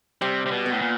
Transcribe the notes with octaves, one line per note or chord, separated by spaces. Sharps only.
C3 G3
C3
B2
B3
A2
A#2